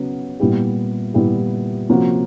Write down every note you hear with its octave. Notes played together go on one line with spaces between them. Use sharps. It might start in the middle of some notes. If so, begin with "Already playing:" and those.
Already playing: C#3 F#3 B3
A#2 G3 B3 E4 G4
A#2 G3 B3 E4 G4
C3 F3 A#3 C#4 F#4